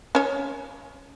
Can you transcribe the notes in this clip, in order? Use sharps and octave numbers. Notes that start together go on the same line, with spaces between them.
C#4 C#5